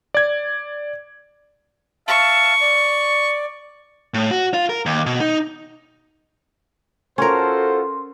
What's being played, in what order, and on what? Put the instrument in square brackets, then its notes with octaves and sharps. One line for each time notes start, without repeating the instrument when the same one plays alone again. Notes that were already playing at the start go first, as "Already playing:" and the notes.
[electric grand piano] D5 G#6
[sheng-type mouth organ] E5 F5 A5 [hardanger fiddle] C#6
[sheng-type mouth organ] D5
[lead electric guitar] A2
F#4
F4
A#4
D#2
B2
D#4
[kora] C#4 A#4 [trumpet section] F4 F#4 C5 [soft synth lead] A4 [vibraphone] C6